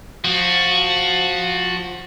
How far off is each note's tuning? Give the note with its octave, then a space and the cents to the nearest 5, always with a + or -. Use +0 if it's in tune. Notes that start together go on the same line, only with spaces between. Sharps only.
F3 +20 F#4 +0